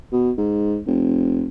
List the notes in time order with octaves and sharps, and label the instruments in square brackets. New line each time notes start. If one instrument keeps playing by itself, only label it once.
[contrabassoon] B2
G#2
F1